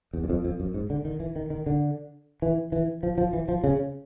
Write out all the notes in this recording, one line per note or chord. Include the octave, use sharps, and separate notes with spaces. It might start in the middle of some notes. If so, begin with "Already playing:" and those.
E2
F#2
F2
F2
F#2
G#2
D3
D#3
E3
D#3
D#3
D3
E3
E3
F3
F3
E3
F3
C#3